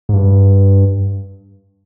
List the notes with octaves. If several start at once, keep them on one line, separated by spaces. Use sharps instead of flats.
G#2
G2